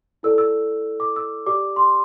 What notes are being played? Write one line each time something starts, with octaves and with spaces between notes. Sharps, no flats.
E4 A4 D5 E6
E6
D6
E6
G4 D5 D6
C6